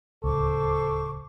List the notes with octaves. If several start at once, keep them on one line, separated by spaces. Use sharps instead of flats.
D1 C#2 A4 C5 C#6 D6